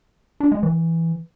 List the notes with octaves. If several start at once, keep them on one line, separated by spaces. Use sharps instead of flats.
D4
G#3
E3